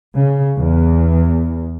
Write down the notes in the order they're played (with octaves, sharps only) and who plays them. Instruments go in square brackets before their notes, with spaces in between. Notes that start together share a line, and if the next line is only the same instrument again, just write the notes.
[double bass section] C#3
E2